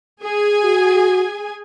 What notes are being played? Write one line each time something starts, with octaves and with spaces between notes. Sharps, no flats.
G#4 G#5
F#4